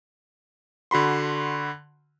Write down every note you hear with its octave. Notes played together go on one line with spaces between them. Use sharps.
D3 F#4 B5 C6